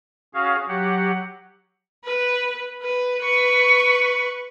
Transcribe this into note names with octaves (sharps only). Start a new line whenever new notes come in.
C#4 F#4 G#4 C#5 F5
F#3 G4 F#5
B4
B4
B4 C#6